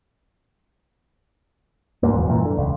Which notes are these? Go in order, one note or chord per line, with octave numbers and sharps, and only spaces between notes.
D2 G#2 A#3
E1 F2 B2
C2 F#2 A#2 E3
D3
E1 C#2